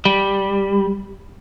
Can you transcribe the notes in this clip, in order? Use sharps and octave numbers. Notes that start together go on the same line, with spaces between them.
G3